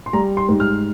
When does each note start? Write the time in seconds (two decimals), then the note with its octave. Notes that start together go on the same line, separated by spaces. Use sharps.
0.06 C6
0.13 G3 A#5
0.37 C6
0.49 G#2
0.60 F6